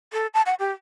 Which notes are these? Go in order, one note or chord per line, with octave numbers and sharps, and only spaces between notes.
A4
A5
F#5
G4